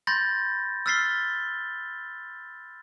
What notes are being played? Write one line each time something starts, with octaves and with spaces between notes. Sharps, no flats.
B5 C6 G6 A6 A#6
E6 F6 A6 B6 C7 G7